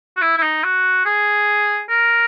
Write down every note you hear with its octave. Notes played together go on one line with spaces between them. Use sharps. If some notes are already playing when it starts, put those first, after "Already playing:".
F#4
E4
E4
D#4
F#4
G#4
A#4